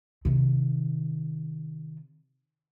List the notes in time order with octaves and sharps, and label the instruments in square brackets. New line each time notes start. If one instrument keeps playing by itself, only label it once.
[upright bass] C3 D#3